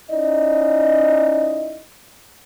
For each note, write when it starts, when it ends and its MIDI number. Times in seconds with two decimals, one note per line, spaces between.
0.11 1.81 61
0.11 1.81 63
0.11 1.81 64
0.11 1.81 74
0.11 1.81 75